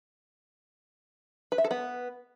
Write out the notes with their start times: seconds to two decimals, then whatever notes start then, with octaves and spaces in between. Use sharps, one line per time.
1.52 B4
1.58 E5
1.64 A4
1.71 B3